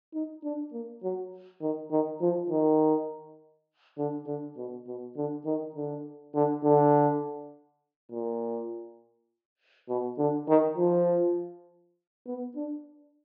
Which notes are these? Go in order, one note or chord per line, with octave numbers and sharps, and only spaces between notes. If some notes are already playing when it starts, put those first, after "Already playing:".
D#4
D4
A#3
F#3
D#3
D#3
F3
D#3
D3
D3
B2
B2
D3
D#3
D3
D3
D3
A#2
B2
D3
D#3
F3
B3
D4